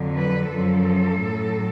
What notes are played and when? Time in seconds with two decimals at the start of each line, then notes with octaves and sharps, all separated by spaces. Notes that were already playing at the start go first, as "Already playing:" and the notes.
Already playing: F2 D3 F#3
0.16 B4
0.52 F#2 F3 A4
1.24 A2 F#3